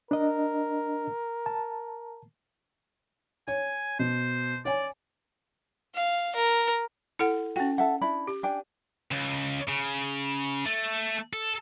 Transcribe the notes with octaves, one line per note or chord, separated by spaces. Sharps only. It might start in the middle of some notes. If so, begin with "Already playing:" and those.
D4 A#4 D#5
A5
C#5 G#5
B2 C5
C#5 D5 G#5
F5
A#4
E4 A4 F#5
C#4 F#4 G5
A4 E5 F#5
D4 E4 B5
G4
D4 G5 G#5
C#2
C#3
A3
A4